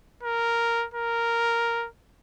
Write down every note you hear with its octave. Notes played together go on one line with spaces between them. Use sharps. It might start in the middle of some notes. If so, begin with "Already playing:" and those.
A#4
A#4